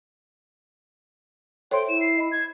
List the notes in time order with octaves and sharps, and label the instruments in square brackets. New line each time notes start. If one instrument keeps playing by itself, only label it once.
[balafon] A4 C5 E5 [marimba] C#5 C6 [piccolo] G5
[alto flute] E4 [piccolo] E7
[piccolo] C7
[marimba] D#5 B5
[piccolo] G#6